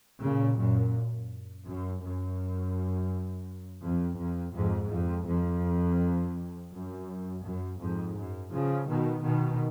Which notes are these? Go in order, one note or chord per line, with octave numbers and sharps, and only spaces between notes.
A#2 C#3
F#2 A#2
F#2
F#2
F2
F2
F2 G#2
F2
F2
F#2
F#2
F2 G#2
F#2
C#3 F3
B2 D#3
B2 D#3